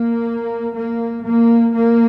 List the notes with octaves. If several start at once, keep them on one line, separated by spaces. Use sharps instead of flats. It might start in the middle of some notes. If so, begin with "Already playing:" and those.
Already playing: A#3
A#3
A#3
A#3